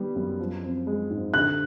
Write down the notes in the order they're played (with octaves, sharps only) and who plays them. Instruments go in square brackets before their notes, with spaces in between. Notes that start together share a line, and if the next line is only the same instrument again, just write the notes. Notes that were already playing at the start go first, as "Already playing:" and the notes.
Already playing: [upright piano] D#3 G3 B3
F#2
F3
C4
G#3
G#2
[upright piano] D3 [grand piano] F#6